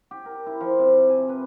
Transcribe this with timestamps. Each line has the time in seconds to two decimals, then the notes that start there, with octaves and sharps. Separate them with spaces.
0.11 G4
0.25 A#4
0.46 E4
0.61 F3
0.79 C3
1.09 G#5
1.29 B4